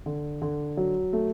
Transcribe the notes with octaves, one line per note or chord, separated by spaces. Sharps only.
D3
D3
F#3
A3